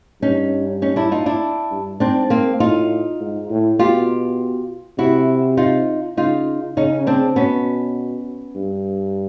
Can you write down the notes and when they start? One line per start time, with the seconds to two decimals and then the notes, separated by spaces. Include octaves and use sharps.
0.22 G2 C#4 D#4
0.82 C#4 D#4
0.96 D4 E4
1.12 D#4 F4
1.26 D4 E4
1.71 G2
2.00 G#2 C4 D4
2.30 A#3 C4
2.60 A2 D#4 F4
3.20 G#2
3.50 A2
3.79 B2 F4 G4
4.98 C3 E4 F#4
5.57 D#4 F4
6.17 C#3 D#4 F4
6.77 C#3 C#4 D#4
7.07 C4 D4
7.36 B2 B3 C#4
8.55 G2